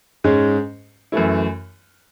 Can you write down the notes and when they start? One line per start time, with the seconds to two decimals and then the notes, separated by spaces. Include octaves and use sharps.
0.24 G#2 G#3 C#4 G#4
1.12 F#2 E3 A3 E4